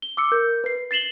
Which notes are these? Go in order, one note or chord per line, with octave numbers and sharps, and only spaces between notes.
G7
D6 E6 C#7
A#4 G6
B4 C7
A6 C7 E7 F#7 G7